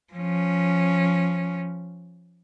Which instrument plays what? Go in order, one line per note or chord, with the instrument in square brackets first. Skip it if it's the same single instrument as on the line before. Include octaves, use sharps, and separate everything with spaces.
[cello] F3 C#4